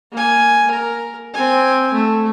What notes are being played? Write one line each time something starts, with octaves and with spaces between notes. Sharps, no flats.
A#3 G#5
A#4
C4 G#5
A3